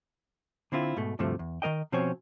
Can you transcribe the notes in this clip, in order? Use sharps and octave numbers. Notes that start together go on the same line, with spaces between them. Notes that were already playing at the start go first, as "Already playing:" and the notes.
D3 C4 E4 F4
G#2 B2 A3
D2 G2 C3 F3 A3
E2
D#3 F#3 A#4 D#5 G5
B2 F3 C4 C#4 C5 C#5